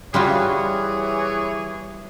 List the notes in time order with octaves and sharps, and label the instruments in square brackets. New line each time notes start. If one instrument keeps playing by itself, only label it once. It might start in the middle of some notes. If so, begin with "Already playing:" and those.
[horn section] E3 G#4 C#5 [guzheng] G3 F4 F#4